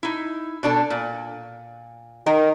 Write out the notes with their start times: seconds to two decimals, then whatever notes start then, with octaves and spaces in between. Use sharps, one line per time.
0.03 D#4 E4
0.63 B2 D4 A4
0.90 A#2
2.26 D#3 A#4